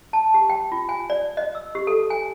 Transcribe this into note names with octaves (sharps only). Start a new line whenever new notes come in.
A5
G4
G5
F4
G#5
D5
D#5
E6
G4
A4
G#5